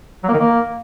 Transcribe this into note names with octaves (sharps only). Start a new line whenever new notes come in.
F#3
A#3
D#3
A#3